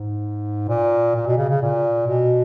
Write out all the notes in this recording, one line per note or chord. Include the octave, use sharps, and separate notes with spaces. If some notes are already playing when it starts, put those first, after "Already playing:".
Already playing: G#2
A#2
A#2
B2
C#3
C#3
A#2
B2